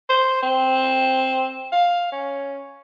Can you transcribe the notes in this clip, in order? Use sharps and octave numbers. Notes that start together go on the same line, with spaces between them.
C5
C4
F5
C#4